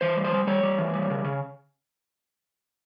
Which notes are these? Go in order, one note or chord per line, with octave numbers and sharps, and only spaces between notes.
E3 C5
G3
C5
G3
G3 C#5
G3
E3
G3
C#3
C#3